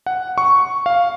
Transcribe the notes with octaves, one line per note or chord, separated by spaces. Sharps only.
F#5
C#6
F5